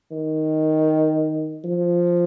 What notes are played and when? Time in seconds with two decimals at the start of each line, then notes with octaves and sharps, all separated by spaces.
0.12 D#3
1.65 F3